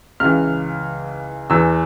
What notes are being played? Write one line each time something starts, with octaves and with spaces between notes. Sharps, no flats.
C#2 C#3 E3 F6
E2 E3 E6